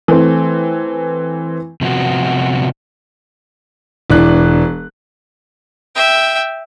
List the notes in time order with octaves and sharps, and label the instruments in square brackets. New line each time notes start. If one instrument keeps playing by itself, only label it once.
[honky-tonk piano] E3 A3 C4
[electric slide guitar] C3 F3 B3 F#4
[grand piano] E1 E3 D4 F#6
[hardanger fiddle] E5 G5